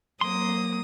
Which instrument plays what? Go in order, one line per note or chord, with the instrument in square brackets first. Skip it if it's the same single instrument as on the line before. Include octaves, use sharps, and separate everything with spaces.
[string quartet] F#3 D#6 [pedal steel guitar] A#3 C6